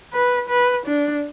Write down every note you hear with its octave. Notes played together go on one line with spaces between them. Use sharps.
B4
B4
D4